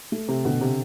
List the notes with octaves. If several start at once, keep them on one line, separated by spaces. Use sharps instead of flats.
A3
C3
B2 D3
C3